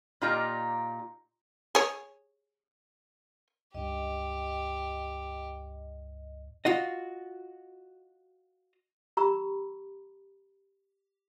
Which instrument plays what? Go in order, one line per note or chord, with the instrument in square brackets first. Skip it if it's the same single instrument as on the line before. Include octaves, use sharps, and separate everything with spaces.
[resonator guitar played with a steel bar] A#2 D#4 F4 G4 D5 A#5
[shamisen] G#4 C#5
[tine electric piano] C#2 G2 [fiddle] G4 [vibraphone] D#5
[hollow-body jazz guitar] F4 F#4 D#5
[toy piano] G4 A#5 B5 C#6 E6